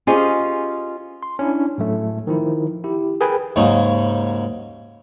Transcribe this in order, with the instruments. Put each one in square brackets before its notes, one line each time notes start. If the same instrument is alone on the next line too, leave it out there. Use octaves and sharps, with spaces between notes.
[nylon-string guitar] C#4 F4 G4 G#4 C5 D#5
[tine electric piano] C6
C#4 D4 E4
A2 F#3 A3
D#3 F3 E4
E4 G4
G#4 A#4 B4 G5 G#5 B5
[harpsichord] D#2 G#2 C#3 F#3